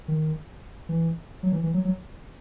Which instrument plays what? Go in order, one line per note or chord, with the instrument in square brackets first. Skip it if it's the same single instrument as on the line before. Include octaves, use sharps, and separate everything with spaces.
[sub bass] D#3
E3
F#3
E3
E3
F#3
F#3